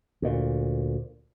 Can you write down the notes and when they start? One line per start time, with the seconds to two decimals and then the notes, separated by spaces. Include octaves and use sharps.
0.22 D2 A#2